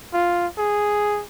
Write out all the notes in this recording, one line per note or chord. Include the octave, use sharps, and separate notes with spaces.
F4
G#4